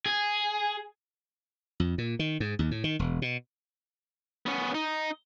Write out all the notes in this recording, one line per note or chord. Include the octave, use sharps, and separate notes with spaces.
G#4
F2
A#2
D#3
G#2
D#2
A2
D#3
E1
B2
B3 C#4
D#4